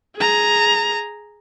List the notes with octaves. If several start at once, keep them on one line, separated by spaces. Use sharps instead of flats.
G#4 A#5